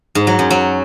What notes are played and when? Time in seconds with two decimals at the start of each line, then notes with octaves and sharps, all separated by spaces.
0.15 G#2
0.27 F#3
0.39 F#2
0.51 F#3